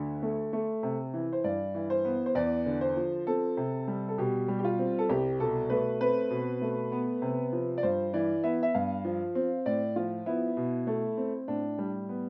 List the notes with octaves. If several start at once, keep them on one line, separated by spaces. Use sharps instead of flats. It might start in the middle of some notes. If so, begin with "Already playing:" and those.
Already playing: D2 D3
A3
A3
C3
E3
C5
G2 D5
E3
C5
B3
C5
E2 D5
D3
C5
F3
C4 A4
C3
G3
A4
B2 G4
G3
G4
F4
C4
A4
C2 G4
B2 A4
A3 B4
C4 B4
B2
A3
B3
C3
F3
D5
G2 C5
E3 D5
B3 E5
E5
G2 F5
F3
C4
A2 D5
F3 F4
B3 E4
B2
A3
C4
A2 D4
G3
B3